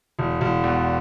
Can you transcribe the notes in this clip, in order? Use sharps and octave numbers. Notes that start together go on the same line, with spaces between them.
E1
E1
E2